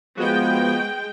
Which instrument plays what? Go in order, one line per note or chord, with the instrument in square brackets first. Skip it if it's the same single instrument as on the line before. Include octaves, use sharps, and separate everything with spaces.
[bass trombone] F3 [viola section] G#3 G5 [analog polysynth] B3 F#4